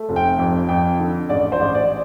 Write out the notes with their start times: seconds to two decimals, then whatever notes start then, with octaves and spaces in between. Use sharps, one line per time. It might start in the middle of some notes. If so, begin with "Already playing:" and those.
Already playing: A3
0.09 F1
0.16 G5
0.39 F2
0.69 F2 G5
0.99 D3
1.29 A1 D5
1.52 C5
1.60 A1
1.75 D5